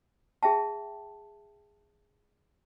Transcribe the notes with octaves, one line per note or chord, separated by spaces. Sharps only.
G#4 E5 G5 A5